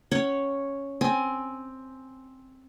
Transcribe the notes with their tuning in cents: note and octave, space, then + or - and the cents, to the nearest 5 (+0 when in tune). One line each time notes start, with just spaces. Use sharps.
C#4 +0 C#5 +0 F#5 +30
C4 +5 G#5 +15